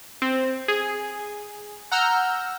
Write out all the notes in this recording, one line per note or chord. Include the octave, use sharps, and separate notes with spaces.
C4
G#4
F#5 A#5 E6 F6 G6